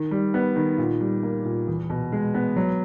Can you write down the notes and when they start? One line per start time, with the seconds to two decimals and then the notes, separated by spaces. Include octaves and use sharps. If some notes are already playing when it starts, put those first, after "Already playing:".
Already playing: D#3
0.11 G3
0.34 B3
0.56 D#3
0.78 A#2
1.01 G3
1.23 A#3
1.45 A#2
1.68 E2
1.90 B2
2.12 G#3
2.34 B3
2.56 F#3